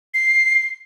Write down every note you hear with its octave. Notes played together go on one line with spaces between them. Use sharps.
C7